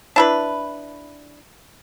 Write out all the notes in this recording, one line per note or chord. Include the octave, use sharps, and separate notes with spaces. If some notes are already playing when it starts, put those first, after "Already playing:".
D4 E4 B4